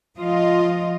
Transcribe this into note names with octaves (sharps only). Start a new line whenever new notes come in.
F3 F4 D#5